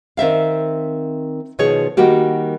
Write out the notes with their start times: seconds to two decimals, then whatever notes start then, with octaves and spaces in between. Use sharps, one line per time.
0.17 D#3 C4 E5 F5
1.59 B2 D#3 F3 G#4 C#5
1.97 D#3 G3 A#3 F#4 G4